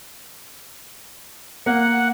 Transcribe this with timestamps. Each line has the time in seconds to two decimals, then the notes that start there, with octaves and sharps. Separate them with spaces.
1.66 A#3 F#5